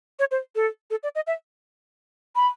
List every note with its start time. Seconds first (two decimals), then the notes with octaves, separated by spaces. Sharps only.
0.19 C#5
0.31 C5
0.56 A4
0.91 A4
1.03 D5
1.15 D#5
1.27 E5
2.36 B5